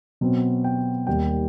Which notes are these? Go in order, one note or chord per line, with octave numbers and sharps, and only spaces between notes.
B2 F#3 C4
G5
D#2 D#3 G3 G5